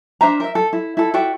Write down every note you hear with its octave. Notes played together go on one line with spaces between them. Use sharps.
D4 C5 E5 A#5
A#4 E5
A4
E4
E4 A4
F#4 D5 E5 G5